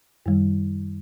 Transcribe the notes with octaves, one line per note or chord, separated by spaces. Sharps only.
F#2 D#3 G3